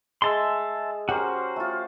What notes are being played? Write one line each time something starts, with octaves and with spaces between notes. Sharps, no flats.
G#3 G#4 E5 A5 C6 E6
C#4 F#4 G4 A#4 C5
A3 F4